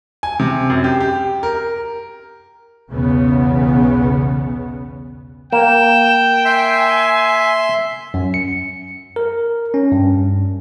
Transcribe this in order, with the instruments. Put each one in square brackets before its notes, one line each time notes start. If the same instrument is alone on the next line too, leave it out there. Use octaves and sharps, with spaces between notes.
[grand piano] G#5
C3
F#2
G4
G4
A#4
[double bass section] B1 E2 C#3 B3
[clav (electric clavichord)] A#3 [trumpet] G5 [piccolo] E7
[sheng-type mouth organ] E5 C6 [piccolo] G#5
[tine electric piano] F#2
C#7
A#4
C#4
G2